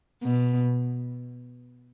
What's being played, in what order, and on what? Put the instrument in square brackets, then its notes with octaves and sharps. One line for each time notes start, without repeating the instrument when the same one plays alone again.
[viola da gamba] B2